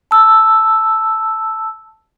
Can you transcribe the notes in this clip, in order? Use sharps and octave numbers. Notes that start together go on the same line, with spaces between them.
A5 E6